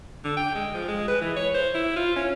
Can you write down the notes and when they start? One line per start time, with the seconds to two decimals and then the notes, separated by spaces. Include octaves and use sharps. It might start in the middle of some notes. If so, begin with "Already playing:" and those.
0.25 D3
0.37 G5
0.55 G#3
0.74 F3
0.88 G#3
1.08 B4
1.21 E3
1.37 C#5
1.55 C5
1.74 E4
1.96 F4
2.16 C#4